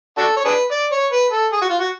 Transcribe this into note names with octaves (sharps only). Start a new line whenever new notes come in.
D4 F#4 A4
C#5
D4 G#4 B4
D5
C#5
B4
A4
G#4
F#4
F4
F#4